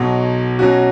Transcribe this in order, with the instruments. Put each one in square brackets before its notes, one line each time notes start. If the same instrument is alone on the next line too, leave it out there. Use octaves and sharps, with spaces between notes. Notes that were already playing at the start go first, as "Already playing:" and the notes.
Already playing: [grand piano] B1 B2 F#3
B2 F#3 C#4 F#4